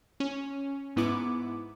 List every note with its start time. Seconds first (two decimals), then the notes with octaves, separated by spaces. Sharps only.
0.20 C#4
0.96 G#2 B3 E4 D6